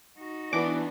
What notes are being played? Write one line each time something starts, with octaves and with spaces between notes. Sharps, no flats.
D#4 F#4
E3 B3 D4 D6